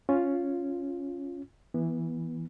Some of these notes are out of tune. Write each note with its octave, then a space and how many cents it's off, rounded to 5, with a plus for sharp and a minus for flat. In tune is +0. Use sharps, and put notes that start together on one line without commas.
C#4 +0 F4 +0
E3 +0 B3 -20